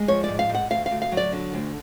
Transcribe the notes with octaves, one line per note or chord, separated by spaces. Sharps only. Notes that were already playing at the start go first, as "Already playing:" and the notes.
Already playing: G#3
F3 C#5
G#2 D5
F5
G#2
F#5
D2 F5
F5
D2
F5
F#3
D5
D3
D2